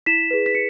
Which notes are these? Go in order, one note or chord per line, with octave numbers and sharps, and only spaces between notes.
E4 B6 E7
G#4 B4
B6
E4 C#7